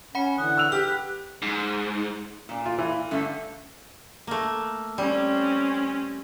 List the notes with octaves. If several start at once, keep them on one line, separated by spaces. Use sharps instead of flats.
C#4 F#5 B5 C#7
D3 E3 F#5 D#6 F#6
E6 F7
G4 B4 F6 B6
G#2
A#2 D5
F4
E3
G2 D3 A3
A3 A#3
G3 C4 C#4